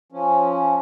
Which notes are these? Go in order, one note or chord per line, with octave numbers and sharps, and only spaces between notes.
F3 C#4